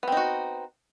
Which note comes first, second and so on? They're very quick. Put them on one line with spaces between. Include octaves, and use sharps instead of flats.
B3 C4 D#4 F#4